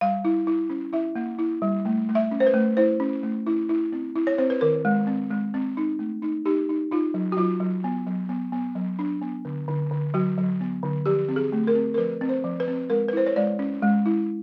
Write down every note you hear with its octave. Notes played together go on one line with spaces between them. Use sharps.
G3 F5
E4
E4
C#4
E4 E5
A#3
E4
G3
A3
A3
E5
C#4
C5
B4
A3
E4 C5
C#4
A3
E4
E4
C4
E4
C#5
C4 C5
B4
D#3 A#4
G#3
C4
G#3
C4
D#4
A3
D#4
D#4 G4
D#4
D#4 F4
F#3
F#4
F#3 F4
F#3
B3
F#3
B3
B3
F#3
D4
B3
D3
D3
D3
F#3 F#4
F#3
B3
D3
F3 G4
C4
G#4
A3
A#4
C4
A#4
F3 B4
C4
C5
F3
B4
C4
G#3 A#4
B4
E4 C5
C#5
G#3 D5
C#4
G#3
E4